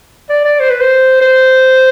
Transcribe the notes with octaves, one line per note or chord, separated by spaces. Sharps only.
D5
D5
C5
B4
C5
C5